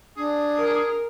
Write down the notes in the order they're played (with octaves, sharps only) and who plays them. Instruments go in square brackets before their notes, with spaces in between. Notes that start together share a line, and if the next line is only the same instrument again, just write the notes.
[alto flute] D4 [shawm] G#4
[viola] A#4